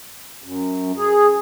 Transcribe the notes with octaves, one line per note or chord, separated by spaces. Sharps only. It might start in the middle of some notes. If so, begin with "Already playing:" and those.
F#2
G#4